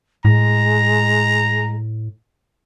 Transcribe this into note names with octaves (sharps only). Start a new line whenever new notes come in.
A2 G#3 A#5